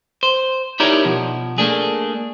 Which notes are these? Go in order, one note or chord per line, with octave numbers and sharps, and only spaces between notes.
C5
D#4 E4 G4 A#4 C#5 D5
B2 F3
A3 A#3 D4 G#4